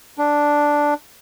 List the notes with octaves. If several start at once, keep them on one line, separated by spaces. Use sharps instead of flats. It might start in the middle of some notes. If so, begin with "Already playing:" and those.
D4